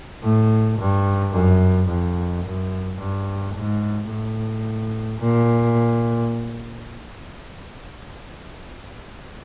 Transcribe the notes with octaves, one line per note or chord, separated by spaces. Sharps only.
A2
G2
F#2
F2
F#2
G2
G#2
A2
A#2